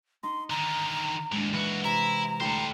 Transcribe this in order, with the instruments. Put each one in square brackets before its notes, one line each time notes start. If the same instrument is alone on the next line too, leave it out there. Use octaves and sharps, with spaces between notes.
[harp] D#4 [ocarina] C6
[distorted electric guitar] D3 D#3 [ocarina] A#5
[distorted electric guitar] D#2 A2 [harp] G#3 D4
[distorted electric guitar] A#2 F#4 [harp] E3
[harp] C3 [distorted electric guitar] E4 [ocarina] A#5
[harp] D2 E4 G5 [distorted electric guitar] A4 C5